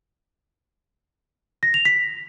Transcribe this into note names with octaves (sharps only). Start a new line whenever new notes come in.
A#6
F7
B6